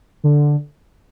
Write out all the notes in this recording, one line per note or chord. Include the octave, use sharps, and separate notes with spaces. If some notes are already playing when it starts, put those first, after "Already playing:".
D3